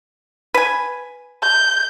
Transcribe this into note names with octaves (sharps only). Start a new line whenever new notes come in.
B4 G#5
G6